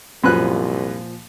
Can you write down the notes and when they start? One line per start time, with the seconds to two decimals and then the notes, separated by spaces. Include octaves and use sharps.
0.24 C2 F#2 A#2 F3 B4 F#6